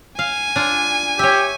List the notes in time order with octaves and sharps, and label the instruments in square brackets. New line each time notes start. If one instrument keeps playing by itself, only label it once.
[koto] F5 [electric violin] G#5
[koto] D4 F4
[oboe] G4 [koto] C#5 E5